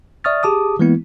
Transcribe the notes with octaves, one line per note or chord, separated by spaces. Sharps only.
D5 E5 C#6 D#6 F6 A6
G4 G#4 A5 D6 D#6
E3 G#3 A#3 B3 E4